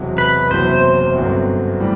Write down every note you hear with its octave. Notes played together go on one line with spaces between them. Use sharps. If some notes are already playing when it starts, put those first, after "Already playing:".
Already playing: E1 E2 C3 F#3
B4
F#1 E2 C3 F#3 C5
G1 F#2 D3 F#3 C4
A2 E3 G3